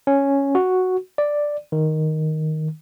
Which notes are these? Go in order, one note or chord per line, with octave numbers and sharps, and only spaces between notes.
C#4
F#4
D5
D#3